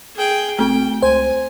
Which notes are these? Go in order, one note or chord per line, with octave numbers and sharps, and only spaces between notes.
G#4 G5
E1 A3 C4 G5
C#2 C5 G#5